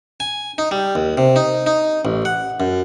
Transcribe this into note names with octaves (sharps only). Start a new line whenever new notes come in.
G#5
D#4
G3
D#2
C3
D#4
D#4
A1
F#5
F#2